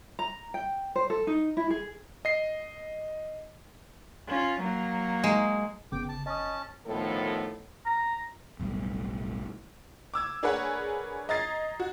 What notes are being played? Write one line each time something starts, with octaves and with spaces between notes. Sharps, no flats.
A#5
G5
C5
A4
D#4
E4
G#4
D#5 C7
C#4 F4
F#3 A#3
G#3
G1 C#3 B3 G5 D6
A5
C#4 D#5 A5 D#6
A2 D#3 F3 B3 A4
A#5
F#1 B1 A2 G3
D6 E6 G#6
D4 G#4 A#4 B4 C#5 F#5
D#5 A#5 G#6 A6 C7
F#4